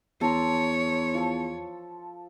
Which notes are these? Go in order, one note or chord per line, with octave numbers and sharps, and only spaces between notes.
E2 A4 C#5 A#5 C6
F3 A4